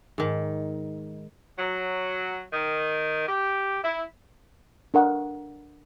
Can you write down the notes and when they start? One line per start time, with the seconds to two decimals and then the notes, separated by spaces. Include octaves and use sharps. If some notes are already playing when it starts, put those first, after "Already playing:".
0.18 G#2 D#3
1.59 F#3
2.53 D#3
3.28 G4
3.83 E4
4.94 D4 A#4 F#5